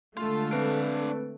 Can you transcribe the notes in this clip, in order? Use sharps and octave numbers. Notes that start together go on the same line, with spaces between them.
D3 G#3 A3 F4
C4 D4 B4 F5 D7